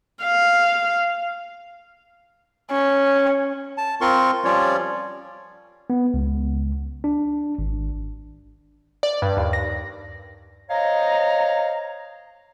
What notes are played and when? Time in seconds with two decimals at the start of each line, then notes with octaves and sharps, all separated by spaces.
0.23 F5
2.71 C#4
3.78 A5
4.01 C4 F4 A#4 C6 C#6
4.45 F3 G3 C#4 F4 C#5 D5
5.90 B3
6.14 C#2
7.04 D4
7.59 G#1
9.03 D5
9.22 G2
9.37 D#2
9.53 A#6
10.70 C5 C#5 D#5 F5 A#5